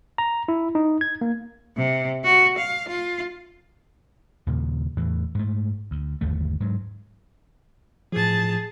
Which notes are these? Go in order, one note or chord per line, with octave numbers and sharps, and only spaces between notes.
A#5
E4
D#4
G#6
A#3
C3
F#4
F5
F4
D#2 A#2 C#3
E2 A2 E3
G#2 A3
D2
G1 D#2 A3
G#2 F#3
A2 F3 G#4 A5